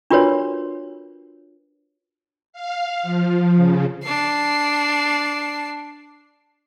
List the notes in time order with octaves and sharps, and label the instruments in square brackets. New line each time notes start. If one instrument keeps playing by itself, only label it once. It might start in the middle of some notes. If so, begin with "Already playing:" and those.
[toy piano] D4 F4 F#4 A#4 B4 C#5
[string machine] F5
F3
C#3
[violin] D4 C7